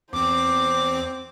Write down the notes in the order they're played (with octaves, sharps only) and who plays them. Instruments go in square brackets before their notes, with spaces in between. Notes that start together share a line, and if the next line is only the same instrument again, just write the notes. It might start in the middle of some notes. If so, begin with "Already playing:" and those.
[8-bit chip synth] E2 C4 [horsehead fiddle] C5 [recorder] D6